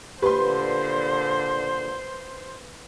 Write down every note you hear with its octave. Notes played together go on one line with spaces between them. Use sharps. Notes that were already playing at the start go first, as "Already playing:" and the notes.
A#2 D3 G4 B4 C5 C6